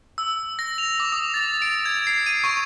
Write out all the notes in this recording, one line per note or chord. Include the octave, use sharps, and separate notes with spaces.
E6
A#6
F7
D6
D#6
A6
D7
G#6
C7
D#7
C#6